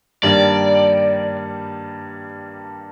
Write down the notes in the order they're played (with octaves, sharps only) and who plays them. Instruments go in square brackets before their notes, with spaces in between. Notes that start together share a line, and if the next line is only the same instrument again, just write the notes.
[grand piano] G2 D#3 G3 A#3 D4 [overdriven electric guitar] D5